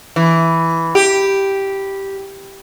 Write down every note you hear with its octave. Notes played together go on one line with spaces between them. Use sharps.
E3
G4